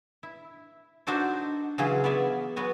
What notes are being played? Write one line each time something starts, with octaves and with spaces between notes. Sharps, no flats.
E4
D4 D#4 F#4 A4 C5 D5
C#3 E3 F#3 G#4 F5 C6
B3 C#5 D5 E5
F#3 B3 F#4 G#5